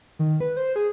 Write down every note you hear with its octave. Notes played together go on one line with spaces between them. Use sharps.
D#3
B4
C5
G#4